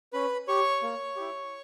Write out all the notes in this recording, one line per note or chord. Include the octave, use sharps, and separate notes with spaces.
C#4 B4 B5
G4 C#5 C#6
A#3
E4 G4